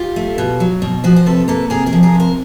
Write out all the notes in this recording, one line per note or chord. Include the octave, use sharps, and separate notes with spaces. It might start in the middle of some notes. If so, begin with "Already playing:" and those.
Already playing: F4 G4
A3
B2
F#3
B2
F3 F#4 G#4
C5
C3 A4 B4
A#3 A4 B4
C3 G#4 A#4
G#4 A#4
F3
G#4 A#4
C3
A#4 C5